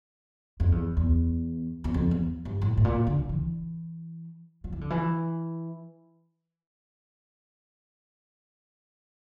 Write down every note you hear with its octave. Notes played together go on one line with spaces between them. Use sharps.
F2
E2
E2
E2
F2
E2
G2
A2
A2
A#2
D3
E3
F3
E3
D3
E3